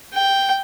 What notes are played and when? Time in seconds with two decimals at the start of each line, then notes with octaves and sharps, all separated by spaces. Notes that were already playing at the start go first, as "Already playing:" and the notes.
0.13 G5